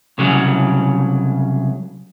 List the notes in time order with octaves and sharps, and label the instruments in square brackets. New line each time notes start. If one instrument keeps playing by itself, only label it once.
[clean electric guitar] C2 C#3 F#3